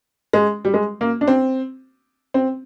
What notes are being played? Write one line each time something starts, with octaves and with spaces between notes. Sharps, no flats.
G#3
G3
G#3
A#3
D4
C4
C4